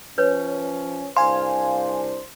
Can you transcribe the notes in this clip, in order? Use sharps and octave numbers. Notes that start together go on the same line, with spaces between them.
F3 C#4 B4 C#5
C2 D4 C5 F5 G#5 C6